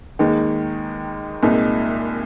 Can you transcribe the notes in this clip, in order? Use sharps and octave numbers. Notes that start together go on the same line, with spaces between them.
D#2 D#3 G#3 D#4
C2 A#2 G#3 D#4